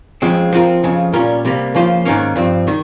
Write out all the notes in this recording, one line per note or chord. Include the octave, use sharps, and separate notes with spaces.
F2 C#3 F3 G#3 C4
F3 C4 F4 A#4
F2 C#3 F3
A#2 G3 C#4 F4 A#4
C3 G3 A#3
C#3 F3 A#3 F4 C5
G#2 D#3 A#3 C#4
G2 F3 C4
D#3 G3